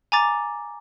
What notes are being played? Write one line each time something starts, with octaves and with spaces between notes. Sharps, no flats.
G#5 A#5 D6 A6